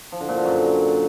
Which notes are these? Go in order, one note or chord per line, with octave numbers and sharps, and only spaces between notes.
F3
D3
A#2
D3
F#2